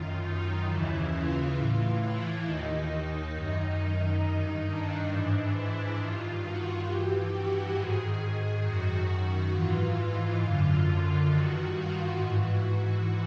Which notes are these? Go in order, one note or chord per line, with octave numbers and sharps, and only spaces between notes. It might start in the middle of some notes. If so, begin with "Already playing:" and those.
Already playing: F#2 D#3 F4
D#4
D#2 C#3 E3 E4
F4
A2 E3
E4
D#2 D#3 D#4
D#4
F#2 D#3 D#4
G2 D#3
D4
G#2 E3 D4
E4
G2 D#3 F4
F#4
G2 E3 G4
F#4
G#2 D#3 G#4
F#2 D#3 F#4
G#2 E3 F4
F#2 D3
F4
G2 D#3 F#4
F4
G#2 E3 F#4